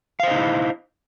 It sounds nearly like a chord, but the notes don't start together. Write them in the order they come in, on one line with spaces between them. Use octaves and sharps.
F5 C5 D#5 D#4 E4